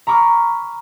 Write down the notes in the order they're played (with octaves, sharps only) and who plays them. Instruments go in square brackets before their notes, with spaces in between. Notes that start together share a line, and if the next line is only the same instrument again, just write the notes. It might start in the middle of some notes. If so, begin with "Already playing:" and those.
[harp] A#5 B5 C#6 D6 F6